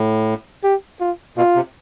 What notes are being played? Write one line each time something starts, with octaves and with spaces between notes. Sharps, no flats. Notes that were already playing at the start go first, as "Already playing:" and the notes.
Already playing: A2
G4
F4
B2 F4
C3